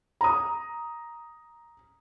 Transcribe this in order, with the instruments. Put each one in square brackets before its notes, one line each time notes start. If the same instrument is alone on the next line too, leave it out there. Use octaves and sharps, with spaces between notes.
[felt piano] A#5 D#6